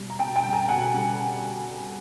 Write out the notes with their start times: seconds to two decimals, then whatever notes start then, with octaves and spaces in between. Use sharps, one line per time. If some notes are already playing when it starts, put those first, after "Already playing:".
Already playing: B2 G3
0.10 A#5
0.19 B2 G5 A5
0.36 G5 A5
0.43 G3
0.53 G#5 A#5
0.69 B2 F#5 G#5
0.94 G3